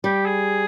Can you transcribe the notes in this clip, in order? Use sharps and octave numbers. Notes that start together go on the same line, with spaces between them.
G3 G4
G#4